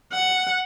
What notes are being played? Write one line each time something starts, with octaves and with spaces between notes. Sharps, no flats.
F#5